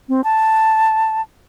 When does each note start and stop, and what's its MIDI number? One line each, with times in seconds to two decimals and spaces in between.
0.09 0.21 60
0.24 1.21 81